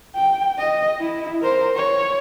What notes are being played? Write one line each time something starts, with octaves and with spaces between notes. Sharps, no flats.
G5
D#5
E4
A#4 C5
C#5